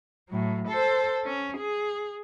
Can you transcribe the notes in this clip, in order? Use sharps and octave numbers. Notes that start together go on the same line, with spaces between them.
A2 F#3
A4 C5
C#4
G#4